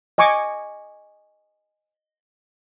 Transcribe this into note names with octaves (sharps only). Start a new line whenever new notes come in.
D#5 G#5 C#6 D6